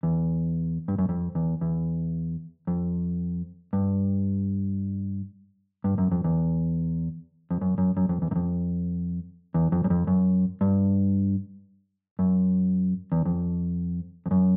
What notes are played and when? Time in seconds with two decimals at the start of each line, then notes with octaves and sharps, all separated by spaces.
0.03 E2
0.88 G2
0.98 F#2
1.09 F2
1.35 E2
1.61 E2
2.67 F2
3.73 G2
5.84 G2
5.98 F#2
6.12 F2
6.24 E2
7.51 F2
7.61 F#2
7.78 F#2
7.97 F#2
8.09 F2
8.22 E2
8.31 F#2
8.36 F2
9.54 E2
9.72 F2
9.84 F#2
9.90 F2
10.07 F#2
10.61 G2
12.19 F#2
13.12 E2
13.26 F2
14.26 F2
14.31 F#2